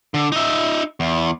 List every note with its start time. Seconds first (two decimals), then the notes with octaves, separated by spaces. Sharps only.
0.14 D3
0.32 D#4 E5
1.00 E2